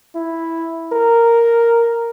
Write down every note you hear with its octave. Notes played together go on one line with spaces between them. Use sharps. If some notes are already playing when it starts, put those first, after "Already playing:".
E4
A#4